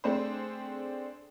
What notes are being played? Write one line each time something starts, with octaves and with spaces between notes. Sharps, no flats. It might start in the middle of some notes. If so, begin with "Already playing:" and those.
A3 C4 D4 G#4 C5